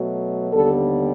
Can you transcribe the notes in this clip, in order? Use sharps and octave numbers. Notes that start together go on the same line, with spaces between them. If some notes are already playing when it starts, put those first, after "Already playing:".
Already playing: B2 F#3 A3
D#2 D3 G3 B3 A4